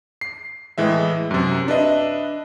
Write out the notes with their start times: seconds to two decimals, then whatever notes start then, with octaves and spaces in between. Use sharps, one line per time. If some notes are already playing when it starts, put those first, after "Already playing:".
0.21 C7
0.78 A2 E3 G#3 E5
1.31 F#2 C3
1.68 D4 B4 D#5 E5